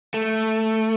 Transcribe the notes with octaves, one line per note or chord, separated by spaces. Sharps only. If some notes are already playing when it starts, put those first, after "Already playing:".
A3